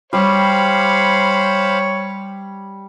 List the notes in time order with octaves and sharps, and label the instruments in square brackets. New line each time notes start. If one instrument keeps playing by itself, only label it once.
[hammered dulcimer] G3 [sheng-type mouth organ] C5 F5 B5 [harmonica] C#5